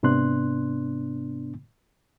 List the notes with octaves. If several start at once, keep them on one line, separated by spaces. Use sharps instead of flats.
G#2 C3 B3 D4 C6 F#6